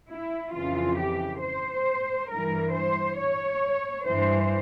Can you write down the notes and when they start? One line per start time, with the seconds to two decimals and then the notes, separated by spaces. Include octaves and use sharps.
0.11 E4
0.54 F2 C#3 E3 F4
0.98 G4
1.42 C5
2.30 G2 E3 A#4
2.74 C5
3.19 C#5
4.06 G2 E3 C5